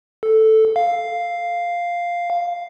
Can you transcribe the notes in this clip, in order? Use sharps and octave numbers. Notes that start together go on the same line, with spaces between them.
A4
F5